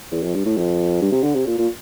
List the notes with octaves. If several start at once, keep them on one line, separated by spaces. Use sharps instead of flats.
E2
F2
G2
A2
F2
G2
C3
D3
C3
A#2
A#2